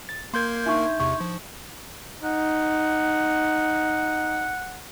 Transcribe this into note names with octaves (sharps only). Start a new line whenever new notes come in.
A6
A#3 A#4 C6 G6 G#6
D4 D#4 E5 C#6
E2 C3 C#6
F3
D#4 F#5